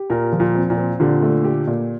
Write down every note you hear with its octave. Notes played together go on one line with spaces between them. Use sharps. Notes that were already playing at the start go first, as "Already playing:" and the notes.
Already playing: G4
A#2 A#4
F3
A#2
C4
A#2
C4
A#2 D3 G4
A3
G4
A#2